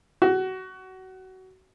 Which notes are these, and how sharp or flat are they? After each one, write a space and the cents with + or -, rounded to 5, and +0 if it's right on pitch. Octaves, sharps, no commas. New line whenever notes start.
F#4 +25